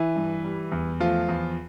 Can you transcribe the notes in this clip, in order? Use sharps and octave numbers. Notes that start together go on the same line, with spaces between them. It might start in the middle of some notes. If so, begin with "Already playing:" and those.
Already playing: E3 E4
G2
G3
E2
F3 A3 F4
E2